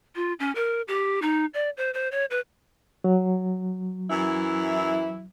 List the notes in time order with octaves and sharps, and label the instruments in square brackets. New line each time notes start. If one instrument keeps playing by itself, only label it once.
[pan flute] F4
C#4
A#4
G4
D#4
D5
C5
C5
C#5
B4
[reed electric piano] F#3
[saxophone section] F#2 E3 E4